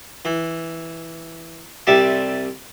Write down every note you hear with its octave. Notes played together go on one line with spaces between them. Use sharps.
E3
C2 C3 G3 E5 A5 D6